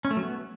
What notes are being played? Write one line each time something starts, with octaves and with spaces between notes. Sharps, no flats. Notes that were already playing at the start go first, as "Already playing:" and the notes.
C#4
A3
F#3
B3